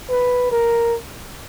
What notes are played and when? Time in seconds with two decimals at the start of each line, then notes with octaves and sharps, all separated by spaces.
0.10 B4
0.52 A#4